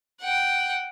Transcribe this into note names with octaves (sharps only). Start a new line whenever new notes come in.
F#5 G5